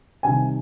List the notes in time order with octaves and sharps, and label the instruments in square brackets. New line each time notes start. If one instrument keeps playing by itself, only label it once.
[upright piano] C2 C3 D#3 G#5